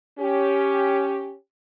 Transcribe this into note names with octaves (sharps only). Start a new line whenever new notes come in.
C#4 G4